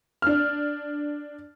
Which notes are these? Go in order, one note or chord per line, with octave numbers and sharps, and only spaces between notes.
D4 F6